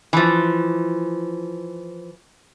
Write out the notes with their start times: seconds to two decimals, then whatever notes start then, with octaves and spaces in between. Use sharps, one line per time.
0.13 E3 F3